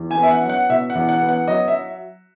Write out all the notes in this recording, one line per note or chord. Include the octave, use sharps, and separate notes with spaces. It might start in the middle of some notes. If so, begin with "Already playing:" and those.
Already playing: E2
G#5
B3
E5
F#5
F#3
F#5
B2 E5
F#5
E2
F#5
B3
F#5
F#3 D#5
E5